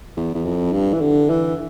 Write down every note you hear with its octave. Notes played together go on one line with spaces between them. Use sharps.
E2
E2
F2
G2
E3
D3
E3